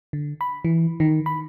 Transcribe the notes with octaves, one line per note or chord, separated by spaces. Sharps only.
D3
B5
E3
D#3
B5